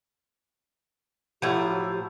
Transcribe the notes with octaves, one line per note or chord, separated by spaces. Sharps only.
A2 F3 F#3 E4 F#4 G4